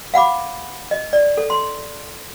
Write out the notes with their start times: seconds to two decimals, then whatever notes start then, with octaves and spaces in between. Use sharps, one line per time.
0.14 F5 F#5 B5 D6
0.91 D#5
1.13 D5
1.37 A4
1.50 C6